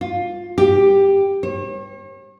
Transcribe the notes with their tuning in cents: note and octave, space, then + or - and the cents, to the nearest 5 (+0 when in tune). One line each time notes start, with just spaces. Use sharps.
F4 +15
G4 +5
C#5 -40